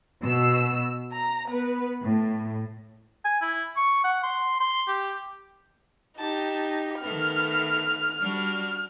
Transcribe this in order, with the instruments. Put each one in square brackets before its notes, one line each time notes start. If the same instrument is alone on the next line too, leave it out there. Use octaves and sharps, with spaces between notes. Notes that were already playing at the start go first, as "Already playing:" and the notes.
[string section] B2 E6
A#5
B3 B4
A2
[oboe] G#5
E4
C#6
F#5
C6
C6
G4
[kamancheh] D#4 G4 [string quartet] A5
[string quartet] D#3 A3 B3 [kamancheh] F6
[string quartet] G3 D4 F#4